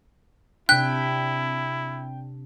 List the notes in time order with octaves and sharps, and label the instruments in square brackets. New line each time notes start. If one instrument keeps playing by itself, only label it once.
[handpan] C3 D4 [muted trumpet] E4 [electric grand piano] G5 B6 [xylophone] F#6